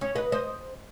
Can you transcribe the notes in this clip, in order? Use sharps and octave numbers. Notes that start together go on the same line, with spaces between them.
C#4
B4 D#5
C5 D#5